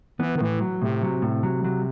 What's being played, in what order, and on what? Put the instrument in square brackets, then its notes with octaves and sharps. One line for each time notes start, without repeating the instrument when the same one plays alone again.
[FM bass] E3 [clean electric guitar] B3
[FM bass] D#3
[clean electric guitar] A2 [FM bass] E3
[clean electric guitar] F#3
[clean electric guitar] A2 [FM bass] C3
[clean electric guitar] F#3
A2
F#3
F#3